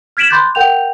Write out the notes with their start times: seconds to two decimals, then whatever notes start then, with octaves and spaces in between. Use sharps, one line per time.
0.17 F6 G#6 B6 D7 E7 F#7
0.30 B5 C6 D6 F#6 G6 A6
0.55 A#4 F#5 G5 G6 F7